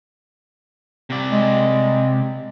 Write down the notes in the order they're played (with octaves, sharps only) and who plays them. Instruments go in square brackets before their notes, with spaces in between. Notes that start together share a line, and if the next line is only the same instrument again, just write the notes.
[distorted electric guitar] C3 D5
[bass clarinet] G#3